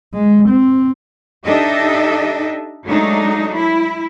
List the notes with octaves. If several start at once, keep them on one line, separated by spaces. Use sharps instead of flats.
G#3
C4
D4 D#4 G4 A4 D#5 E5
F#3 G#3 A3 D4 D#4
E4